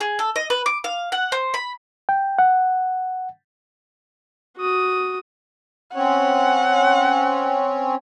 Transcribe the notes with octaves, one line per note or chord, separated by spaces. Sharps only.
G#4
A4
D#5
B4
D6
F5
F#5
C5
B5
G5
F#5
F#4 D#6
C4 C#4 C#5 F#5